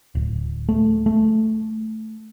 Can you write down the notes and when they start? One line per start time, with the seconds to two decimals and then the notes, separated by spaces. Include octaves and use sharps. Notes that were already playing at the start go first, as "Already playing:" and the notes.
0.15 D1
0.69 A3
1.06 A3